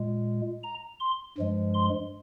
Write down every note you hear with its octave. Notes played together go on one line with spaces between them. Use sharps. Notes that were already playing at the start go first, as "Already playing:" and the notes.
Already playing: A#2 G#3
A#5
C6
G2 F3 G#3
C6